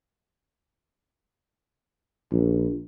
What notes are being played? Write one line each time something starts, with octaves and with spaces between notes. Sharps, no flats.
A#1